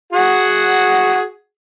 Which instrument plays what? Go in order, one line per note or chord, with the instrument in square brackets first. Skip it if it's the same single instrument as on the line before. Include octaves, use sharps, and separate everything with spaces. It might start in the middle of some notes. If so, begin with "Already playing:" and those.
[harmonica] F#4 G#4 F#5